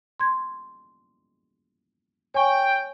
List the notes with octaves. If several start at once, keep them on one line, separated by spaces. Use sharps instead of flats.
C6 G#6
C#5 G5 G#5 C#6